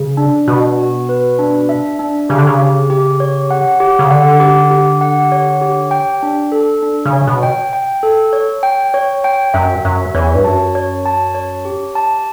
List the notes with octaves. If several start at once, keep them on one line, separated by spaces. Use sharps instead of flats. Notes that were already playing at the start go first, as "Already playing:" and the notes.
Already playing: C#3
D4
B2 F#4
F#4
B4
D4
E5
D4
C#3 G4
D3
C#3
G4
G4
C#5
F#5
G4
C#3
D3 F#5
G4
G4
F#5
C#5
G4
G5
D4
A4
D4
C#3
C#5
B2
G5
G5
A4
C#5
G5
C#5
G5
F#2 E5
F#2 E5
E2 C#5
G2
F#2 A5
C#5
A5
C#5
G4
A5